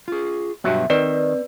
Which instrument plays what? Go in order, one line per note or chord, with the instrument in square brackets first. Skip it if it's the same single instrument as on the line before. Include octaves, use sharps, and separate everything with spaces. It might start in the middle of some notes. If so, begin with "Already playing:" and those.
[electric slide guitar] F4 G#4
[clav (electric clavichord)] G2 B2 F#3 [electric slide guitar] B3 E5
[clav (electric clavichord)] D#3 [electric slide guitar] C4 [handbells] B4 D5